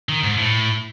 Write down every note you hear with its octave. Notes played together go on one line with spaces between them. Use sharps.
D#3
G#2
A2